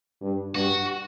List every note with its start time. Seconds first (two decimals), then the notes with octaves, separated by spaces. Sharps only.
0.21 G2
0.55 G2 F#4